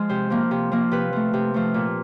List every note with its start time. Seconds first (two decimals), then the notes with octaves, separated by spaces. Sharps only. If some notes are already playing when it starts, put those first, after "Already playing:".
Already playing: F3 G#3
0.09 C3 C5
0.30 F3 A#3
0.51 C3
0.72 F3 A#3
0.91 C3 B4
1.13 F3 A3
1.33 C3
1.54 F3 A3
1.74 A#2